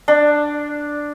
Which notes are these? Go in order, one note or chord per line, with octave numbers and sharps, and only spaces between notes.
D4